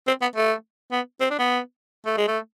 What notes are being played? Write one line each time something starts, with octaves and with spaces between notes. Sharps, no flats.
C4
B3
A3
B3
C4
D4
B3
A3
G#3
A3